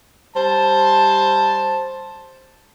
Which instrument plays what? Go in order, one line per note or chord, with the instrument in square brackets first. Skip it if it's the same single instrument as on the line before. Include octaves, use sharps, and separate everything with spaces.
[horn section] G3 C5 A5